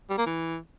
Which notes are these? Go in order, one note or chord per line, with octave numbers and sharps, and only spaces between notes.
G3
A#3
E3